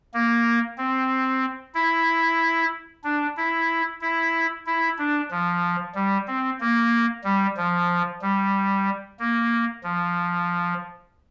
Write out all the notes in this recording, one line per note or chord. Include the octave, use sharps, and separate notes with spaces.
A#3
C4
E4
D4
E4
E4
E4
D4
F3
G3
C4
A#3
G3
F3
G3
A#3
F3